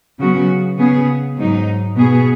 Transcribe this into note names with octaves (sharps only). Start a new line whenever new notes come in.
C#3 F#3 B3 F#4
C#3 B3 G#4
G#2 F#3 D#4
B2 B3 G#4